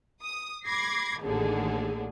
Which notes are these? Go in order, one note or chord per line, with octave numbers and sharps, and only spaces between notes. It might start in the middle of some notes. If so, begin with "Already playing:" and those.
D#6
B5 D6 G#6 A#6 C7
A1 D#2 D3 D#3 G#4